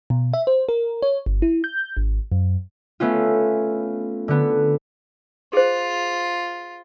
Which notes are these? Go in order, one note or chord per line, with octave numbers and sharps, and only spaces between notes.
B2
E5
C5
A#4
C#5
G1
E4
G6
G#1
F#2
A3 B3 C#4 F4
D3 B3
F4 G#4 C5